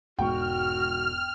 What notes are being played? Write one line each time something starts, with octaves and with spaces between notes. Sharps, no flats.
E1 G#2 F#4 G5 C#6 F6